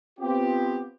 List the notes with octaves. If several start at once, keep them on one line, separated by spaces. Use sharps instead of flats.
B3 C4 F4 G4